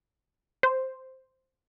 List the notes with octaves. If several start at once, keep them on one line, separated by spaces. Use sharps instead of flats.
C5